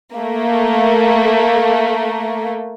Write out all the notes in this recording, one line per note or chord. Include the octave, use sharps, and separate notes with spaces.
A3 A#3